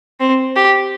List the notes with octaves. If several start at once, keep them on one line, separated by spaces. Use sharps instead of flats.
C4
G4